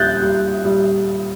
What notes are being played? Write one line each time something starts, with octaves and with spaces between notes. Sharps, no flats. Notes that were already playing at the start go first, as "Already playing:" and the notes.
Already playing: D#2 G3 F#6 G6 A6
G3
G3